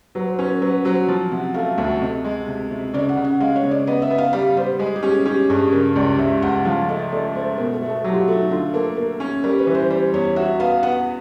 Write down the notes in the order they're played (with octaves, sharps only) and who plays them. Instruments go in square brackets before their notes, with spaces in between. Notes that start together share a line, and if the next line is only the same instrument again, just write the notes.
[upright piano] F#3 [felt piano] B4
[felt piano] C5
[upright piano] C#4 [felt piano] B4
[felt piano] A#4
[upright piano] F#3 [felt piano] B4
[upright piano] F#3 [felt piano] C5
[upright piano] F3
[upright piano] C3 [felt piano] F#5
[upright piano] A3 [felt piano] F5
[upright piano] D2 [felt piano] E5
[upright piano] C3 [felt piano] D#5
[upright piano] G#3
C3
C3
[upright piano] C#3 [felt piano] D5
[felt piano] F#5
[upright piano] C#3
[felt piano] F#5
[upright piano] G#3 [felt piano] F5
[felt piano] C#5
[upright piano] C#3
[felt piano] D5
[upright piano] B3 [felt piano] D#5
[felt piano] E5
[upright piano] B3
[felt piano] F5
[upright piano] G3 [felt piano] F5
[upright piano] G3 [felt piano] C5
[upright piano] G#3 [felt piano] G#4
[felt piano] G4
[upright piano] C#4
[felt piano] G#4
[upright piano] C#4 [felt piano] G4
[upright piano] G2 [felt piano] G#4
[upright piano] C#3 [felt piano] A#4
[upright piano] C#2 [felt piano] D5
[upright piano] C#2 [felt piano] E5
[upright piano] C#2 [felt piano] F#5
[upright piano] F3 [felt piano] F5
[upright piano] A3 [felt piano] D#5
[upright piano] A3 [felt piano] D5
[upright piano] A3 [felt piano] C5
[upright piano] B2 [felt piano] A#4
[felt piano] A4
[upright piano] A3
[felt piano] A4
[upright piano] F#3 [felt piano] G4
[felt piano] F4
F#4
[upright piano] A3
[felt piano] D#4
[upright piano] D3 [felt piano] F4
[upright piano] A#3 [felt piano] A4
[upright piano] A#3
C#4
[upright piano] G3 [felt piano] A#4
[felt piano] B4
[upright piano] E3
[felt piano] C5
[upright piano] G3 [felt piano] C5
[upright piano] E2 [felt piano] C#5
[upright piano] F#4 [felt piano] E5
[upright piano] B3 [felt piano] F5
[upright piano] B3 [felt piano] F#5